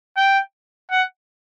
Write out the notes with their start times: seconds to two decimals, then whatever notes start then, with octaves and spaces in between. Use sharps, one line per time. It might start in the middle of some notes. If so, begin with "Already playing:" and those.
0.17 G5
0.91 F#5